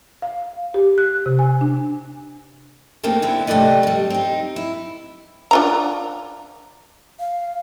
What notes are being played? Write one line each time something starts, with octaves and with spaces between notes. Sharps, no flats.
F5
G4
F#6
C3
G#5
D4
C#3 A3 A#3 C4 D#4
D3 B3 C4 E4
C3 A3 C4 B4 D5 D#5
C3 G3
C4 D#4
E4
D4 F4 A#5
F5